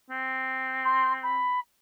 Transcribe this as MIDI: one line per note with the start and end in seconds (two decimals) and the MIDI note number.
0.10 1.52 60
0.85 1.13 84
1.23 1.59 83